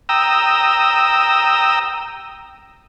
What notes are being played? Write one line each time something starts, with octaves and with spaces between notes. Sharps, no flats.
G5 A#5 D#6 E6